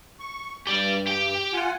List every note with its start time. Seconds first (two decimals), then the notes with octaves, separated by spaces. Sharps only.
0.19 C#6
0.67 G2 G4 D5
1.07 G4 G5
1.53 F4 F#5 G#5